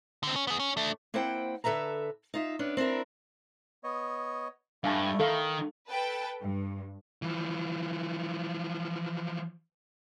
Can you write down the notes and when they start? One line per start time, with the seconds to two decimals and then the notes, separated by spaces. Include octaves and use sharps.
0.23 D3 C4
0.36 C#4
0.47 B3 G#4
0.60 C#4
0.77 A3 D4
1.14 A#3 C4 E4 C5 F#5 G5
1.64 D3 A4 B4 E5 A#5
2.34 D#4 F4 E5
2.59 B3 C#4 D4
2.77 C4 D4 E4 A#4
3.84 B3 C#5 D#5
4.84 G2 A3 E4 F5 G#5 A5
5.20 D#3 A4 F5
5.90 A4 B4 G5 A5
6.41 G2
7.22 E3 F3